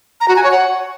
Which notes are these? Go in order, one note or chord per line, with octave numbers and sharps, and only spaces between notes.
A#5
F#4
G#5
C#5
F#5